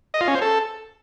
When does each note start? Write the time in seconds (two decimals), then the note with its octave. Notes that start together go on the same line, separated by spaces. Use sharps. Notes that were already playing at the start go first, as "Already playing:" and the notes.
0.14 D#5
0.21 F4
0.28 C#4
0.35 C5
0.42 A4